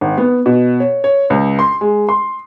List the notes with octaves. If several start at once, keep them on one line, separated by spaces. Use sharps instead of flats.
G#1
B3
B2
C#5
C#5
C#2
C6
G#3
C6